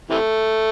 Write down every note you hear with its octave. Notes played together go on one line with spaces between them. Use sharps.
C3 E3 A3